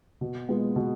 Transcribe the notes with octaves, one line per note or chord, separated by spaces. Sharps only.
B2
G#3 B3 F4
B2